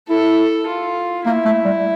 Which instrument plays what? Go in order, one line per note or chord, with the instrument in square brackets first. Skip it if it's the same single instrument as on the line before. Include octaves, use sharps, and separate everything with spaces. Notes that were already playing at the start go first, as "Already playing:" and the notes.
[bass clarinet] E4 [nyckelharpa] A4
[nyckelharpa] F4
[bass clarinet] A#3 [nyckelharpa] E4
[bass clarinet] A3
G3